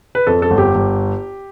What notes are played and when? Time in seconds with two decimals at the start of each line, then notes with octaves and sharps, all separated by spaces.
0.15 B4
0.27 F2 A4
0.42 A4
0.51 G1
0.58 G4
0.75 G1